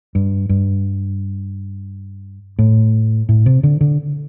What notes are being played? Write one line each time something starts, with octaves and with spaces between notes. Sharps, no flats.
G2
G2
A2
A2
C3
D3
D3